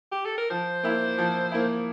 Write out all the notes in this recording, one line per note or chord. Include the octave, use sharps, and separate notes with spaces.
G4
A4
A#4
F3 C5
A#3 E4
F3
A#3 E4